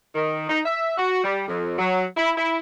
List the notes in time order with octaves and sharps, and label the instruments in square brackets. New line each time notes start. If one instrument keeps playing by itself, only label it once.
[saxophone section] D#3
D#4
E5
F#4
G3
F2
F#3
E4
E4